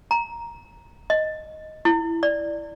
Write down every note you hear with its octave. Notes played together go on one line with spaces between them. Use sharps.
A#5
D#5
E4
D5